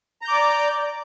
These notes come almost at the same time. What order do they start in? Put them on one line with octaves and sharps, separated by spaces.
A#5 G6 D6 D5